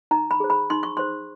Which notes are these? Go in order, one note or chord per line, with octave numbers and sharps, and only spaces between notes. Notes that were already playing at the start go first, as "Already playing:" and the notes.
D#4 A#5
B5
G#4 C5
B5
D#4 C6
C#6
G#4 C5 C6